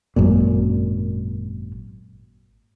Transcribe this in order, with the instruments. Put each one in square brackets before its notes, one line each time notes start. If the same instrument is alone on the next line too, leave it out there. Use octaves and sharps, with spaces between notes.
[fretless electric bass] G#1 F#2 A#2